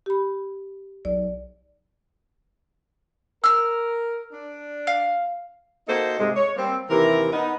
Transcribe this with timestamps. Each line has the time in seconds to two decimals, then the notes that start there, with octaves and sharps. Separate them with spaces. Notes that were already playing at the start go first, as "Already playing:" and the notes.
0.06 G4 B5
1.05 B1 D5
3.44 A#4 E6 F6
4.33 D4
4.87 F5
5.88 A#3 D#4 F#4 A4 C5
6.19 G#2 C3 G#3
6.35 C#5
6.56 G3 A#3 C4
6.89 D#2 C3 E3 A#4
7.33 B3 D#4